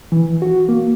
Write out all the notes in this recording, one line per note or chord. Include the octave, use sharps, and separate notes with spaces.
E3
F#4
A#3